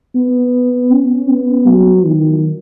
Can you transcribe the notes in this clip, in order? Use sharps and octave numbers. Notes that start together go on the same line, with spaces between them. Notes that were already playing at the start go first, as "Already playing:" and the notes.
B3
C#4
B3
F#3
D#3